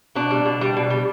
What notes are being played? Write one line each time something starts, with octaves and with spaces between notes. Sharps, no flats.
B2 D4
G3
B2
G3
B2
G3